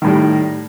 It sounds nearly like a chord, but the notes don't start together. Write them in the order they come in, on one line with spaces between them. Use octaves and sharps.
D#3 A2 G3